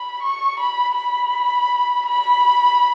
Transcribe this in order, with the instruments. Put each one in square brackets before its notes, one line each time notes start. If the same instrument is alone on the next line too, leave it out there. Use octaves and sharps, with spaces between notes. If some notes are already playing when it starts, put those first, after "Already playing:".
Already playing: [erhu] B5
C#6
B5
B5
B5